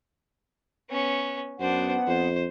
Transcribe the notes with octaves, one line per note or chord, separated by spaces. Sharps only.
B3 C#4
F#2 B3 D4 C5 F#5
F2 C5